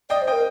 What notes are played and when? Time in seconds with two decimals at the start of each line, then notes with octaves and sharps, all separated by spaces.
0.10 D5 D#5 G5
0.22 C5
0.27 D#5 G5
0.32 A#4